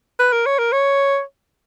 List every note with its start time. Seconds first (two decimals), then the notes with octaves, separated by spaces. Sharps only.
0.20 B4
0.32 A#4
0.46 C#5
0.59 A#4
0.72 C#5